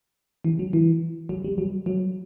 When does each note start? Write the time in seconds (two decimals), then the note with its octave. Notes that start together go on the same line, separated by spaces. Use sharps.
0.44 E3
0.59 F#3
0.73 E3
1.29 F#3
1.44 G3
1.58 F#3
1.86 F#3